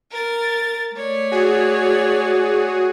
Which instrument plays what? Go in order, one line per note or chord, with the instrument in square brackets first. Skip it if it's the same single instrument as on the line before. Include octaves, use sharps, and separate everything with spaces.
[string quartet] A#4 A6
A3 C#5 D5
[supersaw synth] F#4 G#4